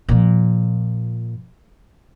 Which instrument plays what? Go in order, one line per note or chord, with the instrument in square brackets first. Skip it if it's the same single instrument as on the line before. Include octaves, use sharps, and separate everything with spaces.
[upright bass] A#2 F3